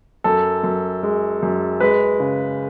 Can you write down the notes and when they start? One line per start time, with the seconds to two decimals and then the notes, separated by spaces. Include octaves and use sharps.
0.24 F#2 A4
0.64 F#2
1.03 G#3
1.42 F#2
1.80 G#3 B4
2.20 C#3